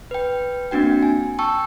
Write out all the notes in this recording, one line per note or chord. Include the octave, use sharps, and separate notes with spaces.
B4 G5
A#3 C4 D4 F#4 G5
G#5
G5 A5 C#6 E6